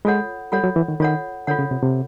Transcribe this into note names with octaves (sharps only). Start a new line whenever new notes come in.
G#3 F4 A4 C#5 F#5
G3 F4 A4 C#5 F#5
F#3
E3
D#3
D#3 F4 A4 C#5 F#5
D3 F4 A4 C#5 F#5
C#3
C3
C3